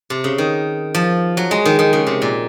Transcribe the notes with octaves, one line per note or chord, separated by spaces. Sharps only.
C3
C#3
D#3
F3
F#3
G#3
D#3
D#3
C#3
C3
A#2